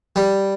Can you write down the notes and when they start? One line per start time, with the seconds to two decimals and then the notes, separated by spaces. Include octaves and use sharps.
0.16 G3